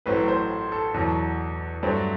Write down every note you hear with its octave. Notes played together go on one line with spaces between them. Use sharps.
A1 A2 F#3 C4 B4
C5
A4
E2 B2 F#3
G2 F#3 A3 C4